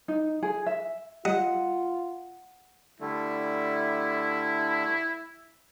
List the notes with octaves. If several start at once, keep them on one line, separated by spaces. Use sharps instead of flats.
D#4
G#4
E5
G3 F4 D#5 F#5
D3 G3 A3 E4